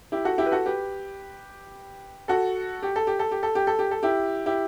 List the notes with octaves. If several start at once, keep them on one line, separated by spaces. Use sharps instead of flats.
E4 G4
F#4 A4
E4 G4
B4
F#4 A4
G4 B4
F#4 A4
G4
A4
G4
A4
G4
A4
G4
A4
G4
A4
E4 G4
E4 G4